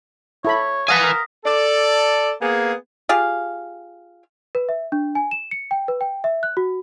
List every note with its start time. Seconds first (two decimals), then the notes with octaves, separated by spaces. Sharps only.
0.45 E4 A4 C#5 B5
0.88 B4 F5 F#5 G#5 A5 D#6 A#6 B6
1.03 A#4
1.45 A4 D5
2.42 A#3 B3 G#4
3.09 F4 G4 G#4 F5
4.55 B4
4.69 E5
4.92 D4
5.15 G#5
5.31 E7
5.51 C#7
5.71 G5
5.88 B4
6.01 G5
6.24 E5
6.43 F#6
6.57 F#4